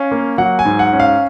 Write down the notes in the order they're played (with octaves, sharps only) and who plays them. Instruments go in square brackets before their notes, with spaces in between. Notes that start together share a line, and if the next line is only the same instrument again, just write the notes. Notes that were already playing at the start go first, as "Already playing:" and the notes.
Already playing: [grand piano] C#4 F5
A#3
F#3 F#5
G#5
G#2
F#5
C#4
F5